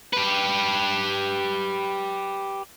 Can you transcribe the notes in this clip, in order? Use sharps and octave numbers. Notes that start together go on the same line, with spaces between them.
G4 B4